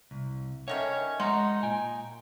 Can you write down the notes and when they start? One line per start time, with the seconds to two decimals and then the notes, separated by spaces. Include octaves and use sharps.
0.11 C2
0.68 D3 D#3 C#4 C#5 E5
1.20 G#3 D#4 F#5 A#5 C6
1.63 A#2 G5 G#5